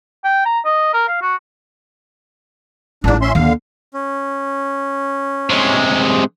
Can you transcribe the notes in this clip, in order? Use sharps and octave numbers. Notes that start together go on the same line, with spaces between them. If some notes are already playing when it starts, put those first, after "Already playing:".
G5
A#5
D#5
A#4
F5
F#4
A1 G#2 D4 E4
C#4 E5 C6
D#2 D3 F5
C#4
C3 G#3